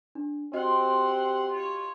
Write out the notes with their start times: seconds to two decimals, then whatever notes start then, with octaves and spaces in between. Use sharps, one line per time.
0.15 D4
0.53 C4 F#4 G4 D#5 F#5 C6
1.52 F4 C#5